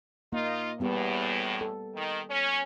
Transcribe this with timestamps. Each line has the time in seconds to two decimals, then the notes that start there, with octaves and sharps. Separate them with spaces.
0.33 A#3 D#4 F4 D#5
0.80 E2 A2 G3 B3 G4
1.61 A4
1.95 D#3
2.29 C#4